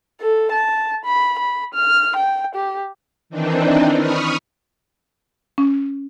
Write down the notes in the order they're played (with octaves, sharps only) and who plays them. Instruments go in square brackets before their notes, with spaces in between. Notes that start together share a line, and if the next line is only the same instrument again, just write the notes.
[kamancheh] A4
A5
B5
B5
F6
G5
G4
[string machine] D#3 E3 C4 D4 D#4
B5 C#6 D#6 F6
[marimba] C#4